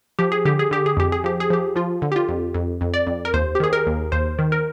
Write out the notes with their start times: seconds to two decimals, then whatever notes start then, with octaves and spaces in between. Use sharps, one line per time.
0.19 F3 G4
0.32 G#4
0.45 D3 G4
0.59 G#4
0.71 D3 G4
0.86 G#4
0.97 F2 G4
1.12 G#4
1.24 F3 G4
1.40 G#4
1.50 F3 G4
1.76 F3 F4
2.02 D3
2.12 G4
2.16 F4
2.28 F2
2.55 F2
2.81 F2
2.94 D5
3.07 F2
3.25 A#4
3.34 D#2 C5
3.55 G4
3.60 D#3 G#4
3.73 A#4
3.87 D#2
4.12 D#2 C5
4.39 D#3
4.52 A#4